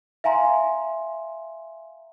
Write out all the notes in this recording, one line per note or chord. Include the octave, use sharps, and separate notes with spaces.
E5 F5 G#5 A#5 C6